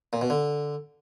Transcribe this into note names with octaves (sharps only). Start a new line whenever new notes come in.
A#2
B2
D3